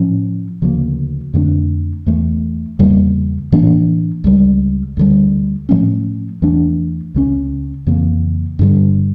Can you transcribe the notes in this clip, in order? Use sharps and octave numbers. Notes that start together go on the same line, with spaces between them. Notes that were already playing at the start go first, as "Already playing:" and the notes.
Already playing: A2 F3 C#4
D2 C#3 F3 A#3
F2 D3 A3 D4
E2 E3 A3
E2 C#3 G3 A#3
A2 E3 A#3 D4
C#2 C#3 G3
D2 D3 G3
A2 F3 A3 C#4
E2 E3 A3 D4
C#2 C#3 G3 C#4
F2 C#3 E3 A#3
G2 D3 G3